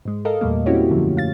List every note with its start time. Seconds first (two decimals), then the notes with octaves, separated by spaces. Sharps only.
0.05 G#2 G#3
0.25 A4 A#4 D#5 F5
0.41 E2 A#2 G3 A3 A#3
0.66 C4 C#4 E4 F#4 G4 C#5
0.90 F#2 D3 F3 F#3 A3
1.17 F5 A6